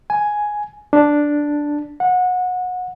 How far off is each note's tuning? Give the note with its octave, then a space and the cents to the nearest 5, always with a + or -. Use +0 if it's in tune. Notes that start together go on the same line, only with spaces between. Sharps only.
G#5 +5
D4 +0
F#5 -25